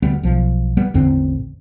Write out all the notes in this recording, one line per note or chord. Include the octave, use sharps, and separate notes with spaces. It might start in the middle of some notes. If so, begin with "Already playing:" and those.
D2 G3 B3
B1 F3
G3 B3
A1 E2 D3 C4